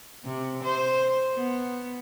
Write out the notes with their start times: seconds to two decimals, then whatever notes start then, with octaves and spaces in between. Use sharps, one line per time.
0.24 C3
0.64 C5
1.35 B3